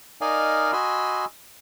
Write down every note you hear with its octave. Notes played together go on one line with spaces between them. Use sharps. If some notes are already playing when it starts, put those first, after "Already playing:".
D#4 A#4 D5 D#5 F5 G#5
F#4 D#5 G#5 B5 C6 E6